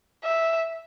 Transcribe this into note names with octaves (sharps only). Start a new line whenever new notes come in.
E5